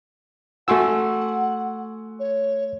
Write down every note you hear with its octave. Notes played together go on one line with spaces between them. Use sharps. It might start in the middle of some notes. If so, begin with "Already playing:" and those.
A3 F#4 F#5 G#5 C6 C#6 E6
C#5